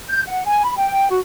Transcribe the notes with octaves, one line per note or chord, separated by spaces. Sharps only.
G6
F#5
G#5
B5
G5
F#4